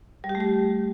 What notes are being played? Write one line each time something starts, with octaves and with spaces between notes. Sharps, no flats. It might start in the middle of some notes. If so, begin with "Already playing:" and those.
G3
G4
A3
G4